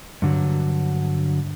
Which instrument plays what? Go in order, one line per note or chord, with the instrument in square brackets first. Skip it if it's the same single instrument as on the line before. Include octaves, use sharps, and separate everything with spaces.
[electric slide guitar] G2 D3 F#3